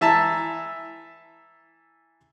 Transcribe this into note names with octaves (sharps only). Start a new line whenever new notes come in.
E3 E5 A5 A#5 E6